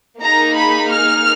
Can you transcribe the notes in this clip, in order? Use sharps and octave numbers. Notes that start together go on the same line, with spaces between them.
A#3 D#4 G#4 A#5
B5
F6